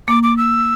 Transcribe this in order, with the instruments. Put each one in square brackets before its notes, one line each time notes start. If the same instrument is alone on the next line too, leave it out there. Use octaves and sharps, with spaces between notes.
[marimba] A#3 [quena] D6
[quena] D6
E6